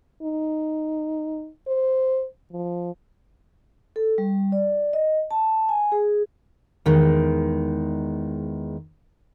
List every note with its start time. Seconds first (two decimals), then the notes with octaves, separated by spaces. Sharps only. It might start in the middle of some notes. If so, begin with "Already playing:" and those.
0.22 D#4
1.68 C5
2.52 F3
3.96 A4
4.18 G3
4.52 D5
4.93 D#5
5.31 A5
5.69 G#5
5.92 G#4
6.86 E2 D#3 G#3